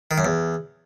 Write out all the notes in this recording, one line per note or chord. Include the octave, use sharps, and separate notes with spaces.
D#3
F#2
E2